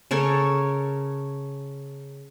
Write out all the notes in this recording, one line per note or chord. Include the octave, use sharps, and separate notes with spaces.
C#3 A4 A#4 C#5